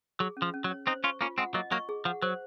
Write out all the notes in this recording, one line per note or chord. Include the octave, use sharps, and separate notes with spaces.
F#3 G#4
C#4
F3
C#4
F#3
C#5
C4 D#4 C5
C#4 F4 C#6
A#3 C#4 F4
G#3 C4 F#5
F#3 A#3 D#5
F#3 A#3 C#6
G#4
F3 F#5
F#3 C5